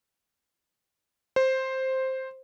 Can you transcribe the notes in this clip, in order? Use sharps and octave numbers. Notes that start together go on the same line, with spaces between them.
C5